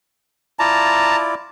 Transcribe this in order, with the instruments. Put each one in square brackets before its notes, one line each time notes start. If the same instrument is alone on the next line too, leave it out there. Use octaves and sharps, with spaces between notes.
[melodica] E4 F4 D5 [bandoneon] A5 A#5